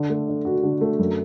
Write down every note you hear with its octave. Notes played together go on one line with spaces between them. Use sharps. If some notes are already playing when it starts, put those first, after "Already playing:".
Already playing: D3
A3
D4
F#4
D3
A3
F#2